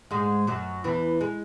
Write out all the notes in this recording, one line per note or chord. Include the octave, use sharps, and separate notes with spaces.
G#2 G#3
F#2 F#3
E2 E3
G#3